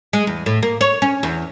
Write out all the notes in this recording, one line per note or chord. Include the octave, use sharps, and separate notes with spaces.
G#3
E2
A2
A#3
C#5
C#4
E2